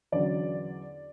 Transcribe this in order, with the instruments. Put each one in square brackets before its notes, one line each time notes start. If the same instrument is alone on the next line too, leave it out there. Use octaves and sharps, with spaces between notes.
[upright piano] E2 D3 F#3 C#4 D5